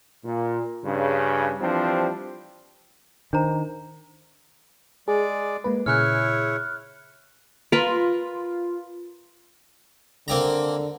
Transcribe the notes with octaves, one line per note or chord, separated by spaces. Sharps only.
A#2
G2 C#3
E3 F3 G3 C4 D4
D#3 D4 C5 A#5
G#3 G#4 D5
G#3 A#3 B4
A#2 C#3 E4 G#4 C#5 F6 F#6
F4 A#4 B4
D3 A#3 C4 A#5